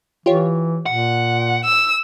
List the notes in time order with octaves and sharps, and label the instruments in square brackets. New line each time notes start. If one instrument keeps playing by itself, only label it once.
[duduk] E3 [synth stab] F4 G4 C#5
[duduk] A#2 [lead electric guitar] F#5
[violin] E6